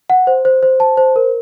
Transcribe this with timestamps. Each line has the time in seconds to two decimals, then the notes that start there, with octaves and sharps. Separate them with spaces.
0.10 F#5
0.27 C5
0.45 C5
0.63 C5
0.80 A5
0.97 C5
1.16 A#4